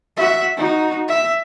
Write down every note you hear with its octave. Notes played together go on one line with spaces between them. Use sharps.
F#4 E5
D#4 F#4
E5